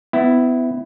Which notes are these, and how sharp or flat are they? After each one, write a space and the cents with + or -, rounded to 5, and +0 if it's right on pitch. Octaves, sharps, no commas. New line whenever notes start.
B3 +30 E4 +0